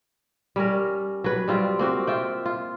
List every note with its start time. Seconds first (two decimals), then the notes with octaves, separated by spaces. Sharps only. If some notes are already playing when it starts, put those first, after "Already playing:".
0.56 G3 C#4 A#4
1.24 F#3 B4
1.48 G3 C4 F4
1.79 A#3 C4 F#4
2.07 F4 E5 G5
2.46 F4